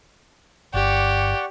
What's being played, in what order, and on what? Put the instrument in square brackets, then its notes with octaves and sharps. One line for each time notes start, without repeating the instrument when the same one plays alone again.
[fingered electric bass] G1 [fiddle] G4 [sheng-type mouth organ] D5 F#5 C#6